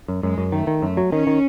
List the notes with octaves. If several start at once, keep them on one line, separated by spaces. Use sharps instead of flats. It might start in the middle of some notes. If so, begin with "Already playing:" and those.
F#2
F#2 G#3
F#2
D#3 A3
D#3
F#2 A3
F#3
D#3 C#4
D#3